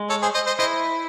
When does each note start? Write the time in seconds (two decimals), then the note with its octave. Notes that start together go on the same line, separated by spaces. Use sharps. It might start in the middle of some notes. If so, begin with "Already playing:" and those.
Already playing: G#3
0.10 A4 C#5
0.22 G#4 C5
0.34 C5 D#5
0.47 C5 D#5
0.59 E4 C5 D#5